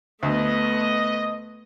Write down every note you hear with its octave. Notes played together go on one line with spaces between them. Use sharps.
D2 A3 B3 D#5